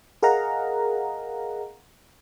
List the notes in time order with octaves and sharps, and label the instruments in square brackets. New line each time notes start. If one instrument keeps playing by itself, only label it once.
[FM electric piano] G#4 A#4 D#5 F5 F#5 A#5